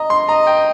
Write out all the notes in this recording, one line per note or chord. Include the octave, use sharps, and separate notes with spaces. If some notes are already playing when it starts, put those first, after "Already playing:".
Already playing: D#5 A#5
C6
D#5 A#5
G5